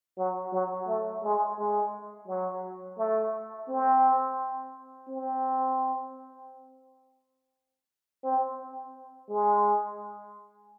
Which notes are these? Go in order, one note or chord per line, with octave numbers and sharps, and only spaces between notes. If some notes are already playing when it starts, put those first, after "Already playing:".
F#3
F#3
A3
G#3
G#3
F#3
A3
C4
C4
C4
G#3